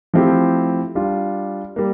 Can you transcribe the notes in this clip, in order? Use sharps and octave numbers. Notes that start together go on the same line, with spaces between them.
F3 A3 C4 E4 G4
G3 D4 F4
G3 A#3